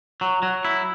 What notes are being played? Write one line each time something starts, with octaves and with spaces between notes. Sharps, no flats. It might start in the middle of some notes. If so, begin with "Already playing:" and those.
F#3
F#3
E4